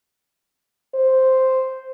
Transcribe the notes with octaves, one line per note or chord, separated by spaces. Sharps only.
C5